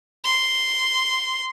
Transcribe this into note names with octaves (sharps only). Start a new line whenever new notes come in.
C6